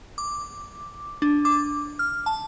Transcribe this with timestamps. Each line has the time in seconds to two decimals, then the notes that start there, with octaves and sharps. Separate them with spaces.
0.18 D6
1.22 D4
1.45 D6
1.99 F6
2.26 A5